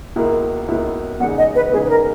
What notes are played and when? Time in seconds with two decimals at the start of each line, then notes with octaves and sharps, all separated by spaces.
0.16 C#2 B2 A#3 E4 A#4
0.68 C#2 B2 A#3 E4 A#4
1.20 E2 C#3 G#3 D#4 F#5
1.38 D#5
1.55 B4
1.72 E2 C#3 G#3 D#4 G#4
1.85 B4
1.90 A#4